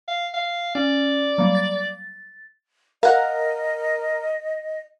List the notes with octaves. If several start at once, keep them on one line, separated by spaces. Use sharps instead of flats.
F5
F5
C#4 D5
F#3 G3 A#3
A6
A#4 D#5 F5 F#5